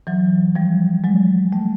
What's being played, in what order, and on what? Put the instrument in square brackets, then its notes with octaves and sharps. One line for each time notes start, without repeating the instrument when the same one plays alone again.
[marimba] E3 F#3
F3 G3
F#3 G#3
G3 A3